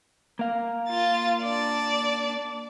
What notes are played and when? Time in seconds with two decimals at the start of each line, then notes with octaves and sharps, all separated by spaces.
0.39 A#3 F5
0.88 F4 A6
1.42 D4 D5